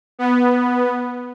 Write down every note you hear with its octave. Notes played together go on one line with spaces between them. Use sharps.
B3